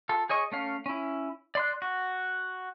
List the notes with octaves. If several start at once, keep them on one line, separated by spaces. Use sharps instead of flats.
F4 A4
G#4 C#5 D#5 C#6
A3 C#4 F5
C#4 E4
D5 C6 F#6
F#4